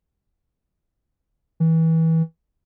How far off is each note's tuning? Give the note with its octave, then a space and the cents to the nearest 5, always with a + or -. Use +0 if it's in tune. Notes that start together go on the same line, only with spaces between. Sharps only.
E3 -25